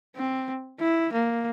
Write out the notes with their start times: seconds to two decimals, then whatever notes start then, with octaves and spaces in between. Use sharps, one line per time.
0.16 C4
0.80 E4
1.13 A#3